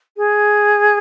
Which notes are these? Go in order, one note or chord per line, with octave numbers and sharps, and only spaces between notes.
G#4